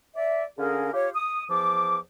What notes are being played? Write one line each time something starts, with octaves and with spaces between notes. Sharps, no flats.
D5 E5
D3 C#4 G#4 A#4 F5
F4 G4 C#5
D#6
E2 F3 D6